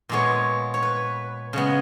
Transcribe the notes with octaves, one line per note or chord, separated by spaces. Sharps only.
A#2 G#3 B3 C#5
C#5
B4
C#3 G#3 B3